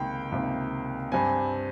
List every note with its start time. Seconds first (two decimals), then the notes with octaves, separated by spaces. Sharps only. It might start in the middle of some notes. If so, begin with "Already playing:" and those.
Already playing: C#2 C3 D#3 A#3 G5
0.32 C#2 C3 D#3 A#3
1.12 G2 G3 C4 G#5